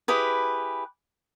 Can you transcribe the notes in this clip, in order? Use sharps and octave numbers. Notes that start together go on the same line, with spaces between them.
E4 G4 G#4 B4